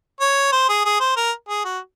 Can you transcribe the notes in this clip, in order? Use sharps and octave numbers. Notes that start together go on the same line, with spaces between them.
C#5
C5
G#4
G#4
C5
A#4
G#4
F#4